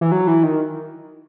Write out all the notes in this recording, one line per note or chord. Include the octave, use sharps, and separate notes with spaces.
E3
F#3
E3
D#3